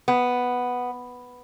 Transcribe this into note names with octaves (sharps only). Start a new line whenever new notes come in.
B3